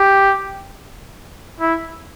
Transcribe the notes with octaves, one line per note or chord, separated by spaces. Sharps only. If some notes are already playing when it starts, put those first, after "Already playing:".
Already playing: G4
E4